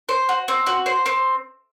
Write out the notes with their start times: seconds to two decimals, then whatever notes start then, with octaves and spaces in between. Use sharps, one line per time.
0.09 C5
0.29 F#4
0.48 C4
0.66 F#4
0.86 C5
1.06 C4